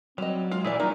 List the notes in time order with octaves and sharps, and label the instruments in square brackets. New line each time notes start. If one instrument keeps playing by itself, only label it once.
[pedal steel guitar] F#3 [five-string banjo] G3 D#5 [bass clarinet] C4
[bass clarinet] G#3 [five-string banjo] F4
[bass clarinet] A#2 [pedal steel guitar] E3 E4 G#4 [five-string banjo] A3 D5
[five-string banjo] G3 A#3 D5 [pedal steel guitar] C#4 [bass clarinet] D#4